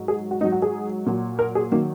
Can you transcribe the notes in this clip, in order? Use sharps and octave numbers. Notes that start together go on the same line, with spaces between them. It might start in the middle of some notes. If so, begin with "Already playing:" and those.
Already playing: G#2 F#3
G#4
F#4
G#2 F#3 D#4
F#4
G#4
A#2 F#3
A#4
G#4
D#3 F#3 A#3